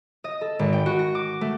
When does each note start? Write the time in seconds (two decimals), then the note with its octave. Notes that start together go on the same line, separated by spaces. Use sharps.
0.24 D#5
0.41 A4
0.59 G#1
0.73 G5
0.86 F#4
0.99 A#6
1.15 D6
1.41 A3